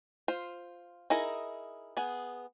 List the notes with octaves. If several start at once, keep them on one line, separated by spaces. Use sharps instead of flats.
F4 C5
D#4 E4 G#4 A#4
B3 G#4